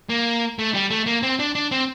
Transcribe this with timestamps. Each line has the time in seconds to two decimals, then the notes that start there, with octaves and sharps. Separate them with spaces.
0.09 A#3
0.59 A3
0.74 G3
0.90 A3
1.06 A#3
1.23 C4
1.39 D4
1.55 D4
1.71 C4